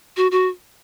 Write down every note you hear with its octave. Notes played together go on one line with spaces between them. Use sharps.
F#4
F#4